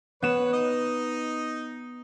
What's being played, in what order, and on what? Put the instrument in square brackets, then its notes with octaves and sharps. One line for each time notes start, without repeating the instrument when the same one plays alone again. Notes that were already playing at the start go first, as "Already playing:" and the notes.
[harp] B3 E7 [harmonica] B4 C#5
[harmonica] D#4 D#5